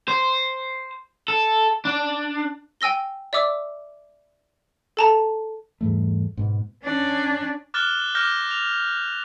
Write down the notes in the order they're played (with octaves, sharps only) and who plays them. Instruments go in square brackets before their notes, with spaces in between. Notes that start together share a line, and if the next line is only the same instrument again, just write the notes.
[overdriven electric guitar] C5
A4
D4
[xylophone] G5 G#5 E6 A#6 G7
D5 E5 D6 E6
A4 A5 A#5
[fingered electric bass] E2 G#2 G3 A3
G#2 B2
[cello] C#4 D4
[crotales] D6 F6 F#6 A6 E7 G7
D6 F6 G6 A#6
F7